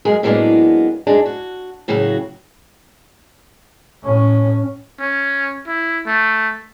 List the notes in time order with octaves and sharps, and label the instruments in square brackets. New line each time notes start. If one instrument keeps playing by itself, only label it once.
[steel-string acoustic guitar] F#2 G#3 G#4 A#4
A2 F#3 G#3 A#3 B3 D4
F#2 G#3 D4
F#4
A2 C#3 F#3 A#3 F#4
[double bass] A2 C#4
[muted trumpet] C#4
E4
A3